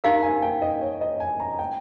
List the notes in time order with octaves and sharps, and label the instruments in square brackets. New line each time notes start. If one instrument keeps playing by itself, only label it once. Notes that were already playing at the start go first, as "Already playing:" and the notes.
[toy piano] D#4 G4 A#4 F5 [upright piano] A#5
[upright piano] G#5
G5
D#5
C#5
D#5
G#5
A#5
G5